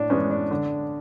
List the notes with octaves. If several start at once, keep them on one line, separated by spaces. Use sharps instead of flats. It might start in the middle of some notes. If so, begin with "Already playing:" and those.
Already playing: A2 D4
E3 G#3 B3 C#4
D4
D3